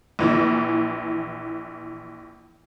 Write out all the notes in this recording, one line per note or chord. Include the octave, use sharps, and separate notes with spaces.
A#1 E3